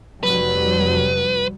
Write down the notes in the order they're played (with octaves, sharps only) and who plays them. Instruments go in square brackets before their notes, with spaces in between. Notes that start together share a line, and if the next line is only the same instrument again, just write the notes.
[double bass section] F1 F#3 G3 [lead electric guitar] B4